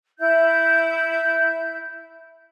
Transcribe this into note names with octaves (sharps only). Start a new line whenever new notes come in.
E4 E5 G6